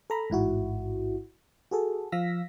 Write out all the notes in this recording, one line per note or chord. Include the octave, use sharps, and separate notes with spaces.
A4 A#5 B5
A1 G#2 E4 F#4
F#4 G#4 A4
F3 F5 E6 A#6 B6